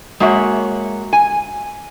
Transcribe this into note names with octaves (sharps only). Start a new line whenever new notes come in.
G#3 A#3 F#4 C#5 E5
G#5